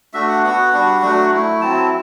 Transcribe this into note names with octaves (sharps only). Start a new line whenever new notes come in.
A3 D4 F#4 E5
F#5
B3 F#4 F#5
G3 D4 F#4
F#3 A3 D4 F#4
A3 E4
F#3 C4 E4 A5